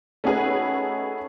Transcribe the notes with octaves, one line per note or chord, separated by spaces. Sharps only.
A3 C#4 D#4 F#4 G#4 B4